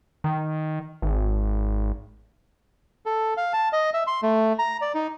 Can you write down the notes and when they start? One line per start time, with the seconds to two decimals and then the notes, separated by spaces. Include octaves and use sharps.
0.24 D#3
1.02 G#1
3.06 A4
3.37 F5
3.53 A5
3.73 D#5
3.94 E5
4.07 C6
4.23 A3
4.59 A#5
4.81 D5
4.95 D#4